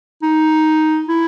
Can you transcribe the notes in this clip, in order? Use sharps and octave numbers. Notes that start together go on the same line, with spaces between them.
D#4
E4